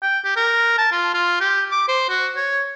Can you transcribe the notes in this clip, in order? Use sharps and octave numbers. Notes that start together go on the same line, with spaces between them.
G5
G4
A#4
A5
F4
F4
G4
D6
C5
F#4
C#5